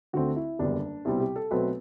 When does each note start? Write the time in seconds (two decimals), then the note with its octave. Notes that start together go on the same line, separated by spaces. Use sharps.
0.13 D2 D3 A3 C4 F#4
0.36 E4
0.59 F#1 E2 D3 G3 D4
1.05 C2 B2 G3 C4 E4
1.20 G4
1.36 A4
1.51 B1 B2 F#3 A3 C4 B4